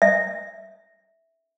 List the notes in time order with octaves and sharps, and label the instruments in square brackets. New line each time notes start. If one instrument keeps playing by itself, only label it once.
[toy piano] E5